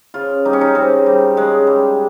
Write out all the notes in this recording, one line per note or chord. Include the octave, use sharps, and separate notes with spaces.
C#3 F4
G3 D#4
C#4
D#4
C#3 C4
G3
C#3 G#3
G3